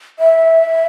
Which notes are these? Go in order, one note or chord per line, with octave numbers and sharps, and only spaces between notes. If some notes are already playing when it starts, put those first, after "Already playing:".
E5